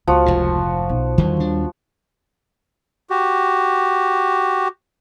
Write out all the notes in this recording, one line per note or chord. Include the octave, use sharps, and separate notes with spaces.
C#2 F3 F#4
F1 G#2
B1
E2 D3 D#3 G3
D#2 D4
F#4 G4